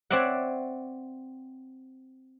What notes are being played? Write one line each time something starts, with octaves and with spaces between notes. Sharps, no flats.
C4 C#5 D5 E5 F#5